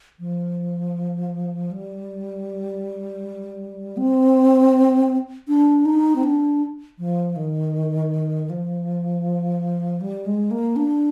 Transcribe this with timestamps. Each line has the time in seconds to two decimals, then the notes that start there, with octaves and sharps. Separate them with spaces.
0.19 F3
1.71 G3
3.97 C4
5.48 D4
5.85 D#4
6.16 C4
6.23 D4
6.99 F3
7.36 D#3
8.50 F3
10.01 G3
10.26 G#3
10.51 A#3
10.76 D4